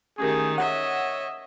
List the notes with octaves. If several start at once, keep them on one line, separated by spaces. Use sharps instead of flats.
D#3 A3 C#4 G4 G#4 A#4
C#5 D#5 E5 F#5